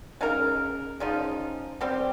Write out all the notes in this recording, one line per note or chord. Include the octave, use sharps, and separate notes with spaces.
C#3 G#3 D#4 A#4
C#3 F3 G#3 D#4
G3 C4 G4